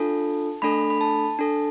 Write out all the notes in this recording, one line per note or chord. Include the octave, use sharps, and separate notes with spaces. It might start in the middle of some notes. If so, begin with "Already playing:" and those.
Already playing: D4 F4 A4 A5
A3 D4 A4 B5
B5
A5
D4 A4